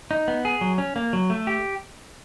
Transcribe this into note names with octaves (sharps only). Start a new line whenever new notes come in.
D#4
B3
G#4
F#3
C#4
A#3
F#3
A3
G4